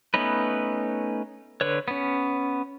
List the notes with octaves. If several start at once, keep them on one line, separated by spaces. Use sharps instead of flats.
A3 B3 C#4 D#4 B4
D3 B4 C#5
B3 C#4